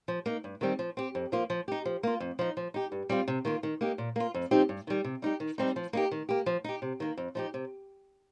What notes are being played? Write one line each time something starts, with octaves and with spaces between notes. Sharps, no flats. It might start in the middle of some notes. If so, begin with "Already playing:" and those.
F3
A#3 D#4
G2
D#3 G3 C4 G4
F3
C4 G4
F2
F3 A#3 F4
F3
D#4 G4
F3
A#3 F4
F2
F3 D#4
F3
D#4 G4
G2
G3 C4 F4
C3
D#3 A#3 F4
D#3
A#3 D#4 G4
A#2
A#3 F4
F2
F3 C4 D#4 G4
G2
D#3 G3
C3
G3 D#4 G4
D#3
G3 C4 D#4
F3
A#3 D#4 G4
D#3
A#3 G4
F3
D#4 G4
C3
D#3 A#3
F2
F3 D#4 G4
C3